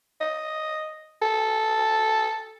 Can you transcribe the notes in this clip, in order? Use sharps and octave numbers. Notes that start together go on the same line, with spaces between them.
D#5
A4